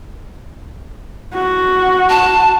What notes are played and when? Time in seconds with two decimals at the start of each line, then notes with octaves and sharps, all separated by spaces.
1.35 F#4
2.09 A5